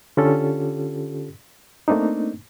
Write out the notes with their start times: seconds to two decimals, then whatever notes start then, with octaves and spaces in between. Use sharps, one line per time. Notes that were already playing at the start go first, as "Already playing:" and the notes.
0.17 D3 C#4 F4 G4 A4
1.88 A3 A#3 C4 D4 D#4